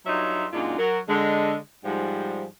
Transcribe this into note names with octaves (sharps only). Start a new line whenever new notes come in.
G2 F#3 D#4 F4 C#5 E5
F#2 A#2 G#3 D4 D#4 F4
F#3 F#4 A#4
D3 G#3
G#2 F3 G3